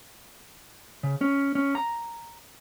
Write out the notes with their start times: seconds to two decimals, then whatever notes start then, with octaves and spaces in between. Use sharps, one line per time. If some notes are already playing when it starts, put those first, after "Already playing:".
1.03 C#3
1.21 C#4
1.55 C#4
1.75 A#5